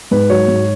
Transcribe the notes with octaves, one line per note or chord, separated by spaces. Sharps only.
G#2 B4
F#3 C#5
G#2